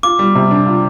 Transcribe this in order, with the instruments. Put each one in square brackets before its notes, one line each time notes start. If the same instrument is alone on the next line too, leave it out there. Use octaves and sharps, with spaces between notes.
[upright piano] F4 [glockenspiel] D6
[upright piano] G3
C3
D4
F4